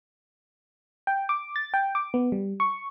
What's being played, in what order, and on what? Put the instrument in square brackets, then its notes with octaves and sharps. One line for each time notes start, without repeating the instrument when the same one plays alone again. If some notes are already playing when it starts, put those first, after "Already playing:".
[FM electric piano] G5
D6
A6
G5
D6
B3
G3
C#6